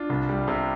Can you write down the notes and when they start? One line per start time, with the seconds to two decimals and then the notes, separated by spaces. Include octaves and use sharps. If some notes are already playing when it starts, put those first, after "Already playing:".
Already playing: D4 F4
0.09 C2
0.29 G3
0.48 C3